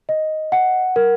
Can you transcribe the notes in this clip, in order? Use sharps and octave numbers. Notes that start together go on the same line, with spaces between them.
D#5
F#5
A#4